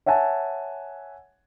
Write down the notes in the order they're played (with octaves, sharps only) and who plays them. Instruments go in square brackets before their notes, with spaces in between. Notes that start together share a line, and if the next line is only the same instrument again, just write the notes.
[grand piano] C#5 E5 F#5 G#5 A5